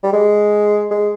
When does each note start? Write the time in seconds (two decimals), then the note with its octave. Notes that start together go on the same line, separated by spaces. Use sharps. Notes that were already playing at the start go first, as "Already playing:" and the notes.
0.03 G3
0.13 G#3
0.91 G#3